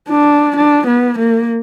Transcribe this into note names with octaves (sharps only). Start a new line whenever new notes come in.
D4
D4
B3
A#3